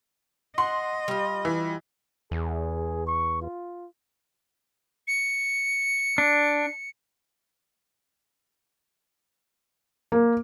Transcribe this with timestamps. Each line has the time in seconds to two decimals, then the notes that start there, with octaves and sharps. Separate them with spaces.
0.58 D#5 F#5 C6
1.08 G3 F4
1.45 E3
2.31 E2 G#4
3.07 C#6
3.42 F4
5.07 C#7
6.18 D4
10.12 A#3